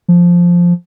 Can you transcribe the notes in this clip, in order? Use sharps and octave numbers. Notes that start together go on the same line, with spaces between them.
F3